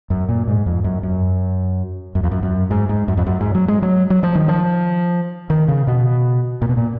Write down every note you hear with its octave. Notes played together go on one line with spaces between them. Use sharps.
F#2
A#2
G#2
F2
F#2
F#2
F#2
F2
F#2
F#2
G#2
G#2
F#2
F2
F#2
G#2
F#3
G#3
F#3
F#3
F3
D#3
F3
D#3
C#3
B2
A#2
B2
A#2